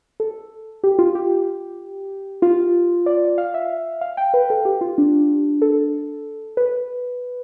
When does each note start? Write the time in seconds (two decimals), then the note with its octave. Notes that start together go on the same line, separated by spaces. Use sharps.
0.20 A4
0.84 G4
0.99 F4
1.15 G4
2.42 F4
3.06 D5
3.38 F5
3.54 E5
4.01 F5
4.17 G5
4.34 B4
4.50 A4
4.65 G4
4.81 F4
4.98 D4
5.62 A4
6.57 B4